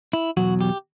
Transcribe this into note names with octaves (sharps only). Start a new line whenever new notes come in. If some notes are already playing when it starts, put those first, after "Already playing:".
E4
E2 B2 F#3 F#4
G4